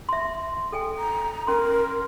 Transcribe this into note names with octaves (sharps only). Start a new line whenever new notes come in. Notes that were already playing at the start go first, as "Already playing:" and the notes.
E5 C6
A4 G5 G#5
A#5
C#4 A#4 C6